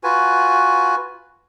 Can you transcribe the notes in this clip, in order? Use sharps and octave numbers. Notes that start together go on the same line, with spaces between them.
F4 F#4 B4 G#5